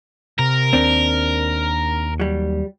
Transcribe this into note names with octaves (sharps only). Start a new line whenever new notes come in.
C3 A#4
D#2 C4 D4
F#3 G3